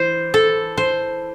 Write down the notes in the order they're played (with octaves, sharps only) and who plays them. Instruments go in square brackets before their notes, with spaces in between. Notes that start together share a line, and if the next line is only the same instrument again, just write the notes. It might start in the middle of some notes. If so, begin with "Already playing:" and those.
Already playing: [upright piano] E3 [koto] C5
[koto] A4
C5